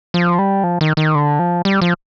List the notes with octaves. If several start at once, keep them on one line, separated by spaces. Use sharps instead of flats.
F3
G3
F3
D#3
D#3
D3
F3
G3
F3